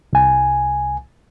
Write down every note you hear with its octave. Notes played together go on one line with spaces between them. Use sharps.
C2 G#5